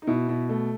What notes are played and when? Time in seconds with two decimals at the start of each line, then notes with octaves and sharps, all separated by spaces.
0.02 D#4
0.07 B2 E4
0.29 B2
0.49 A3